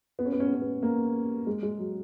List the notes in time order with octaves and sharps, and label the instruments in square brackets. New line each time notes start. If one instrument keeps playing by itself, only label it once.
[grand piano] B3
C#4
B3
C#4
B3
C#4
B3
A#3
G#3
G#3
F#3